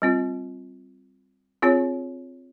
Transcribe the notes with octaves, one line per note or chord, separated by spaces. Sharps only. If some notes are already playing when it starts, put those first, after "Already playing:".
G3 C4 F4
C4 F4 G#4 C#5